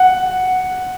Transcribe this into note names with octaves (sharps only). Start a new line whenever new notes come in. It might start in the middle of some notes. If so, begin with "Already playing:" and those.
Already playing: F#5